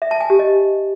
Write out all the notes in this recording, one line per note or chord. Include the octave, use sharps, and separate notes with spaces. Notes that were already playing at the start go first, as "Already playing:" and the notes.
E5
A5
G#5
G4
D#5